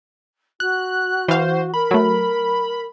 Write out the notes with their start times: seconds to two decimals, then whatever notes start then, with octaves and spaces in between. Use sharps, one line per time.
0.60 F#4 F#6
1.28 E3 C5 F5
1.74 A#4 B5
1.91 F#3 A3